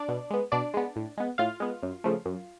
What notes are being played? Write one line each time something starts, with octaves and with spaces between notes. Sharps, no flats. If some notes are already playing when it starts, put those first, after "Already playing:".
Already playing: D4 D5
B2
G#3 B3
B2 D4 D5
G#3 B3
A2
G#3 B3
A2 F4 F5
G#3 B3
F#2
C#3 F3 A3
F#2